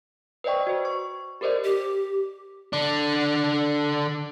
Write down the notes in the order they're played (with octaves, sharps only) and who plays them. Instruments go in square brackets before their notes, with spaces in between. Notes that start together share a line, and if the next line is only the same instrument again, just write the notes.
[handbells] B4 C5 D5 D#5 G5 C#6
F#4 C5
C#6
G4 A4 A#4 C5 D5 D#5
[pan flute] G4
[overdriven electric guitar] D3 D4